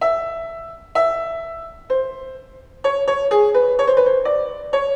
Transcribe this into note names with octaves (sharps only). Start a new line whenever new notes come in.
E5
E5
C5
C#5
C#5
G#4
B4
C#5
C5
B4
C5
D5
C#5